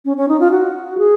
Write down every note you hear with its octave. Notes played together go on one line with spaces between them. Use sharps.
C#4
C#4
D#4
F4
F#4
G#4